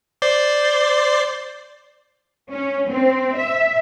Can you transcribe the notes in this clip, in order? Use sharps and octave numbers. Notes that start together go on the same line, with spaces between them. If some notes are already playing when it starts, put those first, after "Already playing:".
C5 D5 C6
C#4
C4
E5